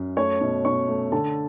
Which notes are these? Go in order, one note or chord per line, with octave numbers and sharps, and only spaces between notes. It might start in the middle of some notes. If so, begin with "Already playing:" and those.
Already playing: F#2
A3 C#5 C#6
B2
B2 C#5 C#6
A3
D3 A4 A5